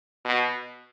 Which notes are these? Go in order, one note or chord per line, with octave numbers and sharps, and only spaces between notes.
B2